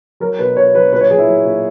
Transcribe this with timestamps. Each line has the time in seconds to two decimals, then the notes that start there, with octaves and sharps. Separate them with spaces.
0.20 F#3 A#4
0.39 B2 B4
0.57 B2 C#5
0.74 F#3 B4
0.92 A#2 B4
1.01 C#5
1.10 F#3 G#4
1.18 E4
1.28 F#3
1.45 A#2